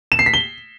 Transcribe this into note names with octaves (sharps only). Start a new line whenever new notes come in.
E7
C7
B6
G7